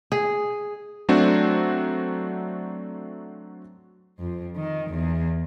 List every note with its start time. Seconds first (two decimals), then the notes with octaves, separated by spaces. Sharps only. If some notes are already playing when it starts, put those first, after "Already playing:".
0.12 G#4
1.09 F#3 A3 C4 D4 F#4
4.19 F2
4.57 D#3
4.91 E2